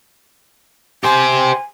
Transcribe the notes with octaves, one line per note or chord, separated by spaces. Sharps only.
G4 C5 G#5